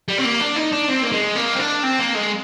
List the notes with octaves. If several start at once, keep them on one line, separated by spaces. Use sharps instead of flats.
G3
C4
A#3
D4
D#4
D4
C4
A#3
G#3
A#3
C4
D4
C4
A#3
G#3